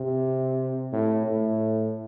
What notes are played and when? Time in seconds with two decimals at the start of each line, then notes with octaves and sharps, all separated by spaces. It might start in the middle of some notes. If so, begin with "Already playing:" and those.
Already playing: C3
0.92 A2
1.26 A2